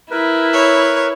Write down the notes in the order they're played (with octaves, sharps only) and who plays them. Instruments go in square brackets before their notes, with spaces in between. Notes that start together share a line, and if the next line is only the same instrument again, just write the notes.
[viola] E4 [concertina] A#4 B4
[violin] C#5